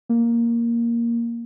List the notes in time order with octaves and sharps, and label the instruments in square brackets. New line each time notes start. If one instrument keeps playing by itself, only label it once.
[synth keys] A#3